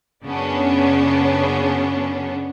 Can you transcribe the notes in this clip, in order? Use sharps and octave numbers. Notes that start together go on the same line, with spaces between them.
F#2 C#3 B3 C#4 D4